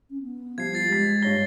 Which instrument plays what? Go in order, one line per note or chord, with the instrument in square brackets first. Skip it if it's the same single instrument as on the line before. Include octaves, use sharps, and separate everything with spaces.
[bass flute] C#4
B3
[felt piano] F3 G3 [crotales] G#6 C7
[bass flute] F4 [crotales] G#6 A6 C7
[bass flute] G#3 [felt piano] G4 B6
[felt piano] G2 C#5 A#6 [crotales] G7